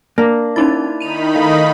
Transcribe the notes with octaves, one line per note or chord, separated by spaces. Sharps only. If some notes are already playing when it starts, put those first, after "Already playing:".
A#3 D4
C#4 D#4 E4 A6
D#3 D#4 B5 D#7 F7
A3 D#5 F5